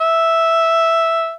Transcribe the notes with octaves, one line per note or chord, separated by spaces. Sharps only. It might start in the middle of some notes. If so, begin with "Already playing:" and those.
E5